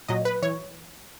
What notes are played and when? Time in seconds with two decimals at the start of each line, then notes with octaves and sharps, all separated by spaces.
0.08 A#2 F#3 D#5
0.25 B4
0.42 E3 C#5